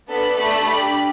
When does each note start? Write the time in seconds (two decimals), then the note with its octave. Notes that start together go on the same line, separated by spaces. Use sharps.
0.08 B3 D4 A4 B5
0.37 A3 D4 A4 B5
0.65 D4 G4 B5